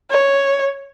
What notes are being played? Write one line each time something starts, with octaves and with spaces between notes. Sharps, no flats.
C#5